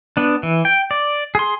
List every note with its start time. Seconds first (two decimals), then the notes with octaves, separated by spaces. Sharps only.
0.17 B3 D4
0.43 E3
0.65 G5
0.91 D5
1.35 G#4 C6